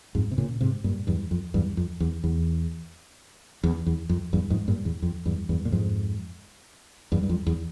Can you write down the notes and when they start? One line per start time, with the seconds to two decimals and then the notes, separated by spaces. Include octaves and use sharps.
0.15 F2 G#2
0.31 C3
0.38 A#2 C#3
0.61 G#2 C3
0.84 G2 A#2
1.07 E2 G2
1.31 F2
1.54 E2 G2
1.77 F2
2.00 E2
2.24 E2
3.64 E2
3.86 E2
4.09 F2
4.33 E2 G2
4.50 F2 G#2
4.68 G2 A#2
4.85 E2
5.02 F2
5.26 E2 G2
5.49 E2 G2
5.65 A#2
5.72 F2 G#2
7.12 E2 G2
7.23 G2
7.29 F2
7.47 E2